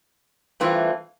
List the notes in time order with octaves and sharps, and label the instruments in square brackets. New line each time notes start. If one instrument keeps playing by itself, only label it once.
[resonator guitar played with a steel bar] G2 E3 A3 C4 F4